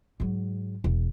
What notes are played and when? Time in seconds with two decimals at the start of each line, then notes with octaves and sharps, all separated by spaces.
0.20 G#2 F#3
0.84 E1